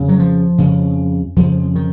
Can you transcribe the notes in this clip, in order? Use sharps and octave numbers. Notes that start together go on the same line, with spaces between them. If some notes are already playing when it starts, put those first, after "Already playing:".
Already playing: F2 C#3
F#3
F3
F2 C#3
F2 C#3 F3
D#3